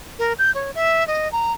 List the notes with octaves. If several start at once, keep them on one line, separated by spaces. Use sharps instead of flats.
A#4
G6
C#5
E5
D#5
A#5